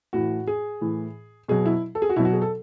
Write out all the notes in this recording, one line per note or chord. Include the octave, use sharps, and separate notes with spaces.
A2 E3 F#4
G#4
A2 E3
B2 F#3 G#4
E4
A4
G#4
F#4
B2 F#3 E4
F#4
G#4
A4